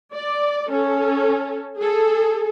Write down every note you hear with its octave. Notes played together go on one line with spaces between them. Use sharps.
D5
C#4 A4
G#4 A4